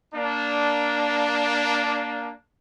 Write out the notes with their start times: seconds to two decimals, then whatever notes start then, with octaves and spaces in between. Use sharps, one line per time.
0.15 A#3 D4